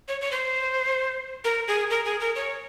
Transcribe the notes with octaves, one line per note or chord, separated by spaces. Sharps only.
C#5
C#5
C5
A#4
G#4
A#4
G#4
A#4
C#5